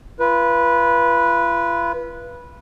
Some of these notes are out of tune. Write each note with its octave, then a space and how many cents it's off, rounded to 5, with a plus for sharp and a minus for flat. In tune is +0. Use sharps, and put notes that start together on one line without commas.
F4 -40 B4 -15